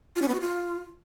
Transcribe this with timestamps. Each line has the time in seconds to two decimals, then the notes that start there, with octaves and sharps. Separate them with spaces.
0.16 F4
0.22 C#4
0.28 B3
0.34 F#4
0.40 F4